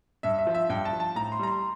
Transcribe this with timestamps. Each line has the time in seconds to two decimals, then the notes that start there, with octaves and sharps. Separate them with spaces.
0.23 G2 E5
0.38 E5
0.47 F3
0.54 E5
0.70 G2 G5
0.85 A5
0.93 F3
1.00 A5
1.16 A2 A#5
1.32 C6
1.39 G3 A#5
1.47 C6